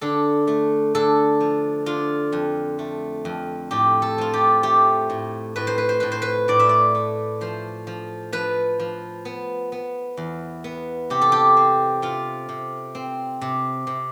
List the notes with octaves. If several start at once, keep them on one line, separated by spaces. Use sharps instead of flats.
D3 A4
A3
D3 A4
F3
D3 F4
F2
A3
F2
A2 G4
A4
F3 F4
G4
A3 G4
A2
A2 B4
C5
B4
C5
A2 B4
C5
B4
A2 D5
E5
D5
A3
F3 C5
F3
F3 B4
F3
B3
B3
E2
B3
C3 G4
A4
G4
C4
C3 F4
C3
C4
C3
C3